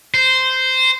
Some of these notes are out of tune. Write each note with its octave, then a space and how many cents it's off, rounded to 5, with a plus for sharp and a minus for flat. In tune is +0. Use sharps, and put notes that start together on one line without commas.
C5 -10